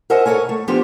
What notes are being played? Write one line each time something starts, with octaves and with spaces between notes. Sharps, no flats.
A#4 C5 D#5 E5 F#5 G#5
A4 A#4 C#5 G#5
A3
F3 G3 B3 D4 G4 C5